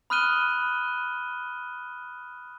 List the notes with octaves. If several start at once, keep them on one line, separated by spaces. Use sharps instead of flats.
B5 D#6 F6 F#6 D#7 G7